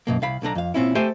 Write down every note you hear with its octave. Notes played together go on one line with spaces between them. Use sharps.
F#2 B2 A#3
C2 F5 B5
B1 D3 D4 A#5
F2 F5
A#2 C4 C#4 E4
A3 G4 C5 E5 G#5